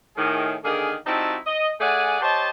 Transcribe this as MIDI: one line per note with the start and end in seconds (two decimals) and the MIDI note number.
0.17 0.55 45
0.17 0.55 51
0.17 0.55 68
0.64 0.95 50
0.64 0.95 51
0.64 0.95 58
0.64 0.95 68
1.06 1.36 55
1.06 1.36 60
1.06 1.36 63
1.06 1.36 64
1.06 1.36 66
1.06 1.36 81
1.46 1.71 75
1.81 2.21 57
1.81 2.21 68
1.81 2.21 74
1.81 2.21 78
1.81 2.21 80
2.21 2.50 67
2.21 2.50 72
2.21 2.50 73
2.21 2.50 75
2.21 2.50 81